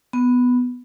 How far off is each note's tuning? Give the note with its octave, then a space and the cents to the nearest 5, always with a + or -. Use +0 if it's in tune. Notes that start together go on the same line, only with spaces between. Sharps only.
B3 +5